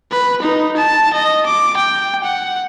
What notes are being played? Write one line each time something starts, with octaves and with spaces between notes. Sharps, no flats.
B4
D#4
A5
D#5
D6
G5
F#5